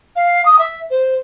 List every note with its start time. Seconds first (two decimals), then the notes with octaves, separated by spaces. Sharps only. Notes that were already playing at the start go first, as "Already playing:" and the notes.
0.16 F5
0.45 D#6
0.59 E5
0.90 C5